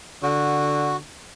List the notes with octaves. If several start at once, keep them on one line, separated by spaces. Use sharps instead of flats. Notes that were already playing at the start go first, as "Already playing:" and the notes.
D3 F#4